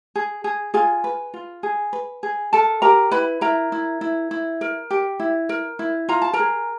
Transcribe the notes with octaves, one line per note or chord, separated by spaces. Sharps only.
G#4
G#4
F4 G#4 G#5
B4
F4
G#4
B4
G#4
A4 A#4 A5
G4 A#4 A#5
E4 B4 B5
E4 A#4 A#5
E4
E4
E4
A#4
G4
E4
A#4
E4
F4 A#5
A5
A#4 A#5
G#4